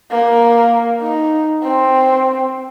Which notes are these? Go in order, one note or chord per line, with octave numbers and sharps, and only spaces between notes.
A#3
D#4
C4